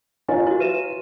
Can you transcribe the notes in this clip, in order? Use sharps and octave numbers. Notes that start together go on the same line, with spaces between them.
E4 F4 A#4 C#5 D#5 G#5
E4 F#4
B4 E5 D#7 E7